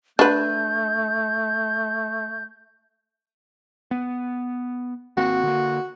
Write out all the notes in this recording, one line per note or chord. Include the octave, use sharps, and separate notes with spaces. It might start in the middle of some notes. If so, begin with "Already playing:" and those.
A3 D4 B4 G6
B3
G#1 A#3 C4 F#4
D3 A#3